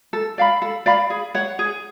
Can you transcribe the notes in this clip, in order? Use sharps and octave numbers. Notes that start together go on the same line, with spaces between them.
A4
D5 F5 B5
A4
D5 F5 B5
G#4
C#5 F#5
G#4